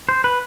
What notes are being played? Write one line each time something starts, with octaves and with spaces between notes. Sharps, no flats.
C5
B4